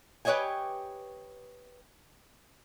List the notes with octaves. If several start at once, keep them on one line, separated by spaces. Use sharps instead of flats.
G4 B4 C#5 D#5 G5 G#5